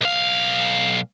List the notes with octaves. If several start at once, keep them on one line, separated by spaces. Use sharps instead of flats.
B1 F5